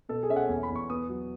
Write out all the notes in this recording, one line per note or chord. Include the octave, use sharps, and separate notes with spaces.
B2 A4
G#4
C#4 E5
F#5
E2 G#5
B5
E2
C#6
B3 D#6
F#3